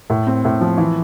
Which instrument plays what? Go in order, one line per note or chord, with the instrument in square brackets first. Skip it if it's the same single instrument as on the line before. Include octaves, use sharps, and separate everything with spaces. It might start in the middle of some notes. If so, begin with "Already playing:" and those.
[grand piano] A2
C4
A2
F3
E3